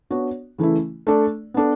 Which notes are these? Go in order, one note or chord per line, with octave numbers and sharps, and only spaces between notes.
B3 D4 F#4 C#5
C#3 E3 A3 E4
A3 D4 A4 D5
B3 D4 A4